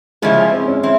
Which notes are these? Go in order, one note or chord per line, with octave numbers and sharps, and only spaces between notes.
C#3 F3 G#3 C#4 E4
C4
C#4
C4 E4